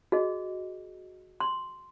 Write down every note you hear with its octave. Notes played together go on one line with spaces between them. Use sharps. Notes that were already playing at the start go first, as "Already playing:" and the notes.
F#4 G#4 D#5
C6